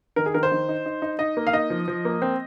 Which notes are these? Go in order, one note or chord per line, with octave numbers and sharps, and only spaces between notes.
D#3 A#4
G#4
D#3 A#4
C5
D#3
D#4
D#4
D#4
D#4 D#5
A#3
F5
D#4 D#5
F3
F3
A#3
C4